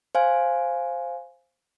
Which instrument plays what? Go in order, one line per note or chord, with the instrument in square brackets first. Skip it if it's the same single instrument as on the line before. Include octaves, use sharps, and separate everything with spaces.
[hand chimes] C5 F5 G#5